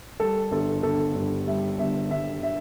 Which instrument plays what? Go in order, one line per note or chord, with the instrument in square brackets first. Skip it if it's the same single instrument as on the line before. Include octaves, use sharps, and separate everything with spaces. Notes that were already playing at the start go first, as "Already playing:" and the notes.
[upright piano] G3 A4
G1 A4
G1 A4
G2
G3 E5
G1 E5
G1 E5
E5